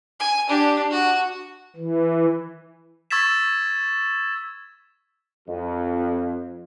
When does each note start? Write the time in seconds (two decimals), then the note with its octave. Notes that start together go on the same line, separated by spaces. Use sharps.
0.20 G#5
0.49 D4 G4
0.91 F#4
1.76 E3
3.11 C#6 E6 G#6 A6 B6 E7
5.48 F2